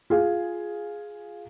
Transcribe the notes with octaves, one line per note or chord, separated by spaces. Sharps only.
F4 G#4 F5